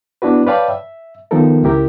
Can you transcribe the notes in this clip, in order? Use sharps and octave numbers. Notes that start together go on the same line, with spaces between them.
B3 D4 E4 F#4 B4
B4 C#5 D5 F5 G5 A5
E5
D#3 F3 B3 D#4 A4 A#4
C#2 E4 G4 A#4 E5